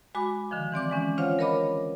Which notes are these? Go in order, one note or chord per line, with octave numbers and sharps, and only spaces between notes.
G#3 F#4 B5 D6
D3 D#3 F3
E3 C4 D5 D6
E3 G#3 C#4
D4 F4 C5 C#5 F5 F#5
A#4 B4 C#5 D#5 B5 D6